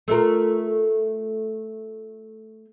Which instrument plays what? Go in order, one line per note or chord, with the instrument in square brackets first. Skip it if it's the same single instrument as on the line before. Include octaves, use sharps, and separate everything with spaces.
[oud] A3 F4 A#4